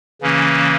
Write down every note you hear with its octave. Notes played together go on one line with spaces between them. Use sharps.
C#3 E3 A#3 C#4